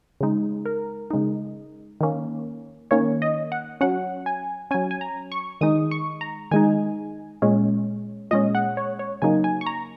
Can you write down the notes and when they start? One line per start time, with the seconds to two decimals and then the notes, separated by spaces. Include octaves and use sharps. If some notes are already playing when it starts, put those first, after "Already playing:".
0.20 C#3 G#3 D#4
0.65 A#4
1.11 C#3 G#3 D#4
2.01 D#3 A#3 C#4
2.91 D#3 A#3 C#4 C#5
3.22 D#5
3.52 F#5
3.81 F#3 C#4 F#5
4.26 G#5
4.71 F#3 C#4 G#5
4.91 G#5
5.01 A#5
5.32 C#6
5.61 D#3 G#3 D#4 D#6
5.91 C#6
6.21 A#5
6.51 D#3 G#3 D#4 G#5
7.42 A#2 G#3 C#4
8.31 A#2 G#3 C#4 D#5
8.55 F#5
8.77 C#5
8.99 C#5
9.22 C#3 F#3 A#3 D#4 G#5
9.44 G#5
9.61 C#6
9.66 A#5